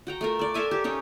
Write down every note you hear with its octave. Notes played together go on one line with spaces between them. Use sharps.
F#4 G5 A#5
A3 F4 A#4
A4 D5
A4 A#4 E5 G#5
G4
C#4 D#4 G4